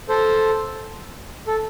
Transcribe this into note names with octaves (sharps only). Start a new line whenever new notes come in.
A4 C5
A4